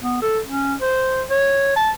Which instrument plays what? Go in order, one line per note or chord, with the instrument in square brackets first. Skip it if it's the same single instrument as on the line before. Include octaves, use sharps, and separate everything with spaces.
[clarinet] B3
A4
C#4
C5
C#5
A5